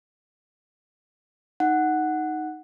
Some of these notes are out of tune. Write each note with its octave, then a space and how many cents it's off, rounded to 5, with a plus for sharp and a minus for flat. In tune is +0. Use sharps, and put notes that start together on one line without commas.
D#4 +0 F#5 +0